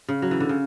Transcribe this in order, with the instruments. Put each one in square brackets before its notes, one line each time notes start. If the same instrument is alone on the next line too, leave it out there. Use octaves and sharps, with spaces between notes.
[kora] C#3
F#3
E3
D3
C#3